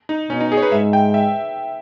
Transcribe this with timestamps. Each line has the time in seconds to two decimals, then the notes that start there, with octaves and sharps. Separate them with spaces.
0.09 D#4
0.30 B2 C#4
0.41 D#4
0.52 G#4
0.57 C#5
0.62 B4
0.72 G#2 E5
0.93 G5
1.14 E5